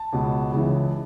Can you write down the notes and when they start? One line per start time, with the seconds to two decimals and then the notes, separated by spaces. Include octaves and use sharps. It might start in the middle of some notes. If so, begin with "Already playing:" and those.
Already playing: A5
0.13 C#2 B2
0.52 C#2 C#3 E3